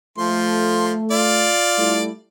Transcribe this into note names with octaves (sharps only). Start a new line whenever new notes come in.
F3 A3 C6
F4 D5
G3 A3 E4